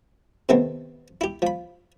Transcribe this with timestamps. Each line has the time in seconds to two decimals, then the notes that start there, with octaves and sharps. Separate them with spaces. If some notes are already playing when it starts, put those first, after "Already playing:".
0.49 C3 D#3 A3 B3 C4
1.21 E4 G4
1.42 F3 B5